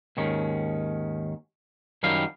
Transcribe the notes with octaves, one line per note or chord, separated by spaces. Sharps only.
D#2 G#2 D#3 C#4
F#2 D#3 F#3 G3 F5